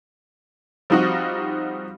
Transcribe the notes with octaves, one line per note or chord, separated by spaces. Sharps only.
F3 G3 C4 D#4 F4 F#4